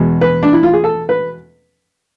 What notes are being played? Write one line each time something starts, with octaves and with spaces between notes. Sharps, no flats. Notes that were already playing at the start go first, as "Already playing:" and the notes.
Already playing: E2 B2 G#3
B4
D4
E4
F4
G#4
A4
B4